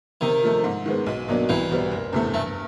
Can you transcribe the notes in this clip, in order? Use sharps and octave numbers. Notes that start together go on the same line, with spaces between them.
C3 D#3
F3 A3
G#2
D#3 G#3 B3
B1
B2 F#3 A#3 D4
C2 E3
B2 G3 B3
F#1
E2 C3 E3 A3
G2 A3